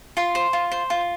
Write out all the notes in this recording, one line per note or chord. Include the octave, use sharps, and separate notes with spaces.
F4 C6
C5
F4
C5
F4